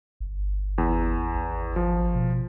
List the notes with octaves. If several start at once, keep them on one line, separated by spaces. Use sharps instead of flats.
G1
E2
G#1
F3
B2